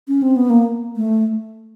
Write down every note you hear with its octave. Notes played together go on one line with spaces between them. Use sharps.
C#4
C4
B3
A#3
A3